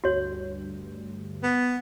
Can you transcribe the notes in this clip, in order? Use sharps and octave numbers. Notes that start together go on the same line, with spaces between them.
D2 G2 F#4 C#5
B3